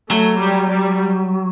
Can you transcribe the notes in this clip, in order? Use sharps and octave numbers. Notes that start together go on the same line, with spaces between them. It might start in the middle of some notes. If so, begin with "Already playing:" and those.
F#3 A3
G3
G3